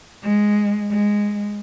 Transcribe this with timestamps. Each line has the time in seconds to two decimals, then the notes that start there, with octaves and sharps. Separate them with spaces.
0.23 G#3
0.90 G#3